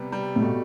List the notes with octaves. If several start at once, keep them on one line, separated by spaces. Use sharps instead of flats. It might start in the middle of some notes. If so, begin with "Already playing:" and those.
Already playing: C3 G3 B3
G3
A2
B2 A3